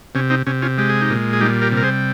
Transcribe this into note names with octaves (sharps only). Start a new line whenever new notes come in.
C3 C#4
C4 D#4
C3 C#4
C#4 F4
G#3 G4
G#4
D#4 G4
A#2
G#4
G3 D#4 G4
G4 A#4
C3
A#4
G#4 C5